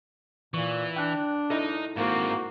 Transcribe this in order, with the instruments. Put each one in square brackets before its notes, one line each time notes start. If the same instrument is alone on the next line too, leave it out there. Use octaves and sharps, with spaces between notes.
[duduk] A#2 [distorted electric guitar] E3 [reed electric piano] C#6
[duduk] D4 [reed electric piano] G5 F#6
[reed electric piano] D#4 E4 A4 [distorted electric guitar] D#5 A#5
[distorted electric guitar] G#2 C4 [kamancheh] A#3 [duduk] F#4